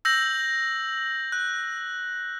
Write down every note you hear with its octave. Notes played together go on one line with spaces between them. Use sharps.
E6 G6 A#6 F#7
F#6